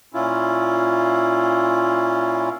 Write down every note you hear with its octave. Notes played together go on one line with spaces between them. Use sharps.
A#2 C#4 E4 F4